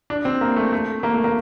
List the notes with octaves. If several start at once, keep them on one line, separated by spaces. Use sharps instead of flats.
D4
C4
A#3
A3
A3
A#3
A3
A#3